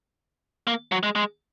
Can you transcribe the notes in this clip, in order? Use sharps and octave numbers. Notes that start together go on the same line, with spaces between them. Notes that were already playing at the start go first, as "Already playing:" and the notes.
A#3
F#3
G#3
G#3